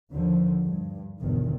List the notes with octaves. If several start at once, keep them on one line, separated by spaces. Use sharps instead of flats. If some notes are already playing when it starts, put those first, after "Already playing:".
D#2 D3 F3
G2
G1 E2 B2 D#3